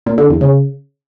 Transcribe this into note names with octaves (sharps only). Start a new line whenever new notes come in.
A#2
D3
E2
C#3